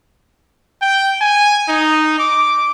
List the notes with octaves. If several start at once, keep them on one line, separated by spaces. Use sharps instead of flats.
G5
G#5
D#4
D6